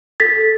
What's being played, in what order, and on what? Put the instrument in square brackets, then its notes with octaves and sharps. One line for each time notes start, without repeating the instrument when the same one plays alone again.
[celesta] A4 A6 B6